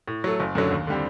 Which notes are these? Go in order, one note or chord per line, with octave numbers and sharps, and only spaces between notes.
A2
F#3 A3
F#1
F#2 D3 F#3 A3
D#2
D3 G3 C4